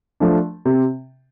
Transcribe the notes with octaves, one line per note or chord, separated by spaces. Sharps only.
F3 A3 D4
C3